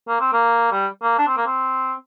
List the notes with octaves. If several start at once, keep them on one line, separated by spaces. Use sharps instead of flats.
A#3
C4
A#3
G3
A#3
D4
C4
A#3
C4